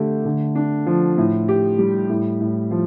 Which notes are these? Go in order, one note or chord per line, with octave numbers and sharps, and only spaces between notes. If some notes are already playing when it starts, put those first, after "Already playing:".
Already playing: D3 A3 G4
D3
D4
F3
A2
G4
G3
A2
A2
F3